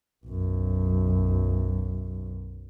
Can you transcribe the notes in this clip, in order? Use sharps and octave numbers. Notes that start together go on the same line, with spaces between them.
B1 F#2